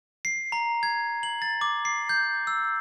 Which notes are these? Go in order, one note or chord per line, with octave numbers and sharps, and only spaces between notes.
C7
A#5
G#6
F#7
A6
D6
C7
G6
E6